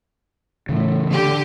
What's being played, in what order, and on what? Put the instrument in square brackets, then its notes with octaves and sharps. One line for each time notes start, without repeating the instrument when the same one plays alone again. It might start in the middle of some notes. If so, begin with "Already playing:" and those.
[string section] A2 [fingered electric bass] C#3 E3
[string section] D3 G4